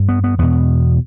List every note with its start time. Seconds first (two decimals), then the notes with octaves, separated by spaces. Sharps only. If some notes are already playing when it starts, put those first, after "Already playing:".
Already playing: G2
0.09 B3
0.24 B3
0.39 E2 B2 B3